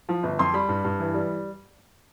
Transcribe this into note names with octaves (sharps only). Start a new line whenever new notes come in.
F3
G1
F2 C6
G3 B5
G2
G2
E3
G3